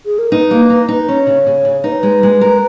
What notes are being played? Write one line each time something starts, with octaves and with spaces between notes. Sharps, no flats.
G#4
A#4
D#4 B4
A#3
D#4
D#4
C#4 C#5
C#3
C#3
C#3
D#4 B4
C#5
G#3 B4
G#3
A#4